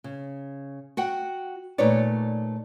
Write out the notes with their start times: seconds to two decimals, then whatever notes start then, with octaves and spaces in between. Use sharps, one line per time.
0.04 C#3
0.97 F#4 F#5 G5
1.78 A#2 A3 D#4 B4 C#5 D5